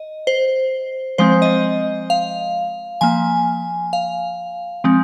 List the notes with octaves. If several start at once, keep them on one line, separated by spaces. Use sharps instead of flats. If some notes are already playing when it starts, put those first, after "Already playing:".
Already playing: D#5
C5
F3 G#3 C4 C5
D#5
F5
F3 A#3 G#5
F5
F3 G#3 C4